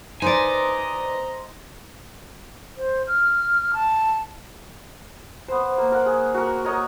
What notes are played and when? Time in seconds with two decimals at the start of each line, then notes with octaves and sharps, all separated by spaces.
0.22 D#4 B4 C5 D5 D#5 G#5 A#5
2.77 C5
3.07 F6
3.73 A5
5.48 B3 C5
5.78 A#3
5.92 A#4 F#5
6.06 G#4
6.34 F#4 A#4
6.64 A#4 C#5 D#5